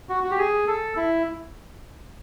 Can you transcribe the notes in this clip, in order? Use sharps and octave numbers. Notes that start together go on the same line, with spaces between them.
F#4
F#4
G4
G#4
A4
E4